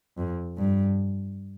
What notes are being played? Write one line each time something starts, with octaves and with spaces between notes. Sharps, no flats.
F2
G2